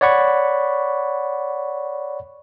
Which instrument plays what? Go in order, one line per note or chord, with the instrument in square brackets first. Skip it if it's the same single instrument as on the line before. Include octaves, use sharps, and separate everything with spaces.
[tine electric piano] C#5 D5 F#5 B5 C#6